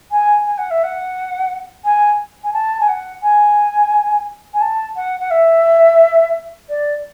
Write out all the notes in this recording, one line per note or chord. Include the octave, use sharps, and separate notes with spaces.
G#5
G#5
F#5
E5
F#5
G#5
G#5
A5
G#5
F#5
G#5
G#5
A5
F#5
F#5
E5
D5